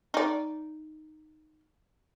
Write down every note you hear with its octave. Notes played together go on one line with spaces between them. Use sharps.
D#4 D5